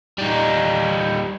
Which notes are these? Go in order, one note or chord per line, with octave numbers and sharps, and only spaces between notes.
G3 D#4